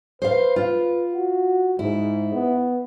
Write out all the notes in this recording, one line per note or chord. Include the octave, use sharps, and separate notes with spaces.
B4 C5 F5
F4
F#4
G#2 E4
B3